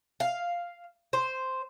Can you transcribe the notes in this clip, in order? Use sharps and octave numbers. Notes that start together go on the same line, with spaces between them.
F5
C5